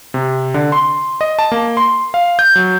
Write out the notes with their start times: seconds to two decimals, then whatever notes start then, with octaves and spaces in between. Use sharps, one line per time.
0.14 C3
0.54 D3
0.72 C6
1.21 D#5
1.39 A5
1.52 A#3
1.77 C6
2.14 F5
2.39 G6
2.56 F#3